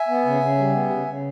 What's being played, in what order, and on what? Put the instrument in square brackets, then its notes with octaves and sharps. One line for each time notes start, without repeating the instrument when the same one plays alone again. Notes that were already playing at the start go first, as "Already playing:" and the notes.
Already playing: [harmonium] E5 G#5
B3
C#3
C#3
G3
B3
C#3
C#3